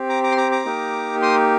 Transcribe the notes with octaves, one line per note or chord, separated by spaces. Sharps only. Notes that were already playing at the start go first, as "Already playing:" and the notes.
Already playing: C4 G4
A#5 D6
A#5 D6
C6
A#5 D6
A#5 D6
A#3 D#4 G4
C6 D#6